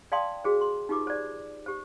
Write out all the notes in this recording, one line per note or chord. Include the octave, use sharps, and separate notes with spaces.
D5 F5 G5 A5 C6 D#6
F#4 G#4 C5
C6
D#4 F4 G4 B4 D6
C5 D5
G4 C5